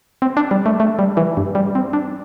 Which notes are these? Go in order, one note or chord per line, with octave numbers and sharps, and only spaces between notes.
C4
D4
G3
A3
A3
G3
E3
G2
G3
C4
D4